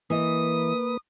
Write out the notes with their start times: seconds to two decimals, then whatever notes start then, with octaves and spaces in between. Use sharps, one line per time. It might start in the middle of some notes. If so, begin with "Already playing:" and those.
0.10 E3 A#3 B4 D#5 D#6